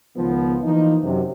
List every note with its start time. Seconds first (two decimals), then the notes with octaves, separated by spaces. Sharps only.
0.16 C#2 D#3 F3 B3
0.64 E3 F3 A#3 D#4
1.03 F#2 C3